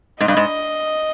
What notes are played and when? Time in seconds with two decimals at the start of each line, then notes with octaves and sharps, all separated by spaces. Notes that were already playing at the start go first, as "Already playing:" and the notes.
0.20 G#2 D#5
0.28 G2
0.37 G#2